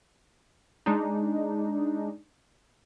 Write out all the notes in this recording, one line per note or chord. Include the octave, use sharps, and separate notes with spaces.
G#3 D4 D#4